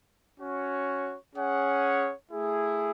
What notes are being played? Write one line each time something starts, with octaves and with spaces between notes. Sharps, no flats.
C#4 F#4 C#5
C#4 G#4 C#5 F#5
A3 E4 G#4